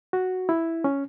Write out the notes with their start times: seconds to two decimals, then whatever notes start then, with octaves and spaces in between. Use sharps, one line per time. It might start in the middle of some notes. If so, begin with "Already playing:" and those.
0.13 F#4
0.49 E4
0.84 C#4